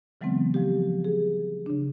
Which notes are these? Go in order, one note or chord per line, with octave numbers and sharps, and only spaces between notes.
C#3 E3 F#3 G#3 B3 C4
F3 G4
G#4
C#3 D4